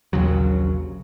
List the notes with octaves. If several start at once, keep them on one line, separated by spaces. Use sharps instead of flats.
A#1 D#2 C#3 F#3